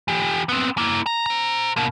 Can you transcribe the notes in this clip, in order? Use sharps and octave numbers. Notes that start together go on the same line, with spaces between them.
E3 G4
B3 C4
A#3 E4
A#5
C5 A#5
B2 A#3